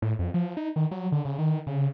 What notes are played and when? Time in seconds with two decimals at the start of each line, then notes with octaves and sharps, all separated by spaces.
0.02 A2
0.19 F2
0.34 F3
0.57 D#4
0.76 D#3
0.91 F#3
1.12 D3
1.25 C#3
1.39 D#3
1.67 C#3